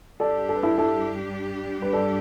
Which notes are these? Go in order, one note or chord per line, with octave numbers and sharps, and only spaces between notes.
G2 G3 D4 G4 A4 D5
A4
B4
E4 A4
E4 A4
B4
A4 D5